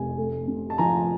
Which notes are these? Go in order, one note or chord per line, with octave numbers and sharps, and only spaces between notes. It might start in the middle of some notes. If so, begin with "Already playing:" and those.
Already playing: F1 G#5
A3
C3
A5
F3 G#5 A#5